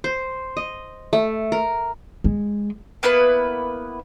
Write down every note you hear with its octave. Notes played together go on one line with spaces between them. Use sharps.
C5
D#5
A3
A#4
G#3
A#3 B3 E4 B4